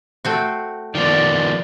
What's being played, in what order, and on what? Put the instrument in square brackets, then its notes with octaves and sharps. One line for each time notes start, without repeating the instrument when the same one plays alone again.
[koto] A3 C4 F#4
[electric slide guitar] D#3 F3 B3 [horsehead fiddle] D5